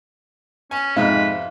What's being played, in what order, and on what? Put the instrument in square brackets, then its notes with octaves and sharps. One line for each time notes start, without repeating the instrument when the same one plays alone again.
[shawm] C#4 [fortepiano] G#5
[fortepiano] F2 C3 [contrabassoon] G#2 [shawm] B4 [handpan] F5